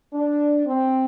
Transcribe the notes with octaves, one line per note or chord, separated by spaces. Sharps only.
D4
C4